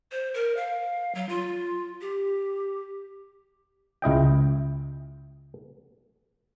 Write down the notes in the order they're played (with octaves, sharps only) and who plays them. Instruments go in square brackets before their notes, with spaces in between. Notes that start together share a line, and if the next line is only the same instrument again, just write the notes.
[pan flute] C5
A#4
F5
F#3
F4
G4
[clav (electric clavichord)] C#2 E4 D#5 G5